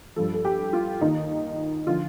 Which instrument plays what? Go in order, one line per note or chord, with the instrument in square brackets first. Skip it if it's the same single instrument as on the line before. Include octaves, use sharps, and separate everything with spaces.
[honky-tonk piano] G2 F3 A4
A4
G4
F4
D#2 D#3 D#4
D3 F3 F4